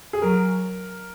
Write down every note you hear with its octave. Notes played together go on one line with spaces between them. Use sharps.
G#4
F#3 A#4